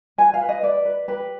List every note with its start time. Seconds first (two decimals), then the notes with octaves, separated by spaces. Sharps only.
0.18 B4 G#5
0.34 F5
0.41 B4
0.49 D#5
0.63 B4 D5
0.85 B4
1.08 G4 B4